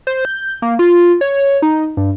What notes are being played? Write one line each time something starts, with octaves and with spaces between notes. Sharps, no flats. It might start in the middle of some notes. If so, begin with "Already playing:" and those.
C5
G6
A#3
F4
C#5
D#4
G2